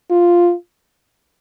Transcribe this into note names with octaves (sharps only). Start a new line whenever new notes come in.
F4